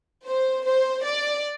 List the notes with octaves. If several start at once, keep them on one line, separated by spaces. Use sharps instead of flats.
C5
C5
D5